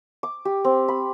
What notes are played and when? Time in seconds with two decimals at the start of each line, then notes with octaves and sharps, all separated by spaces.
0.23 D6
0.45 G4
0.64 C4
0.88 B5